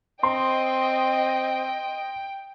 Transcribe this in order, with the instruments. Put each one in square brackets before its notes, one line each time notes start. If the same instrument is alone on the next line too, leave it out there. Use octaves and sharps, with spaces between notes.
[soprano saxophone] C4 [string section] D#5 [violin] G5 [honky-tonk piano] C6